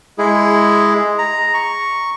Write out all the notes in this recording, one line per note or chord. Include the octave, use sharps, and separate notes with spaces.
G#3 E4 G#4
A#5
C#6